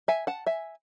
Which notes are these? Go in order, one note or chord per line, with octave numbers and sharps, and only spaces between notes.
E5 G#5
F#5 A5
E5 G#5